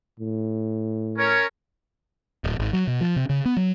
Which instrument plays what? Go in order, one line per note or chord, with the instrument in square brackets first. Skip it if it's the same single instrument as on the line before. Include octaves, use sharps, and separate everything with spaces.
[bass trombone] A2
[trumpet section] C#4 A#4 C#5
[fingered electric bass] D1
G#1
F#3
B2
F3
C3
C#3
B3
F#3